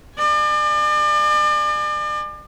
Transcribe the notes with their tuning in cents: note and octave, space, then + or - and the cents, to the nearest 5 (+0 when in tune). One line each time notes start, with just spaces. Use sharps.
D5 +40 G#5 +0